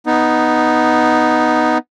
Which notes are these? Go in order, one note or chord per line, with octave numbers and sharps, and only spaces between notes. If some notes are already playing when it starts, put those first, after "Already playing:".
B3 D#4